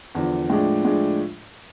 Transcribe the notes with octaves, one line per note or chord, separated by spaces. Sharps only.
E2 D3 F3
A2 F3 G#3 D4
A2 F3 G#3 D4